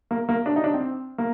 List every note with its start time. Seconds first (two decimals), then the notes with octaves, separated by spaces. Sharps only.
0.11 A#3
0.29 A#3
0.46 D4
0.56 D#4
0.64 D4
0.74 C4
1.18 A#3